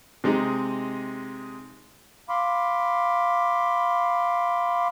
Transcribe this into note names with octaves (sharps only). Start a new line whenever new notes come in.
C3 G#3 D#4
F5 B5 C6 D6